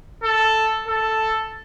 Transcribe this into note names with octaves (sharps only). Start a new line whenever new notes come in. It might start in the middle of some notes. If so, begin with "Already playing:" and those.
A4
A4